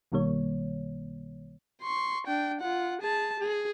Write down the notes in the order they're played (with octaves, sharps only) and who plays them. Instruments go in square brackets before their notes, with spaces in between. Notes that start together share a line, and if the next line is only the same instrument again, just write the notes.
[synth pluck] B1 B2 D#3 G3 A#3 C#5
[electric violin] C6 C#6
D4 G5
F4 F#5
G#4 A5
G#4